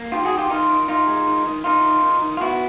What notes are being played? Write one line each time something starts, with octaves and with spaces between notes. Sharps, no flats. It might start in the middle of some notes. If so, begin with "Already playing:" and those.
Already playing: A#3
D#3 F4 G4
F#4 G#4
D#3
F4 G4
D#3 D#4 F4
D#3
D#3 D#4 F4
G#3
D#3
D#3
D#3 D#4 F4
D#3
D#3
D#3
F4
B3 E4 F#4